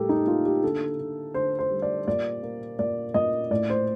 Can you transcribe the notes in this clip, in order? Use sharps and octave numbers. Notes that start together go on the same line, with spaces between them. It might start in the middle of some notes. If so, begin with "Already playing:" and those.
Already playing: A2 G3 A#3 G4 A4 A#4
D#4
A#3 F4
G4
D3 A4
D3
D3 C5
C5
G3
D5
A#2 D5
A#3
A#2 D5
A#2 D#5
A2 D5
C5